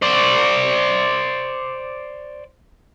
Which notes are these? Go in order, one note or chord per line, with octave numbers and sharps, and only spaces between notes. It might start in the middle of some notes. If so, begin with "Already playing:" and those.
C5 D5